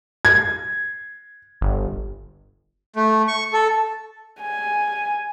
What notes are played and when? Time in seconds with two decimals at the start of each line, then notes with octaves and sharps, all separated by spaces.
0.25 G#6
1.61 G1
2.96 A3
3.28 C#6
3.53 A4
4.41 G#5